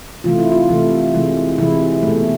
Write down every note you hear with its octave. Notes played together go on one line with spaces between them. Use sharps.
C3 E3 A3 F4
E4
F4
C3 E3 A3
C3 E3 G#3
C3 E3 G#3 E4
B2 A3